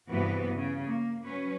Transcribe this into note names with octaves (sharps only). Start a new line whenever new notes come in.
G2 C3 E3 B3 F#4 B4
C#3
A#3
F#3 C#4 B4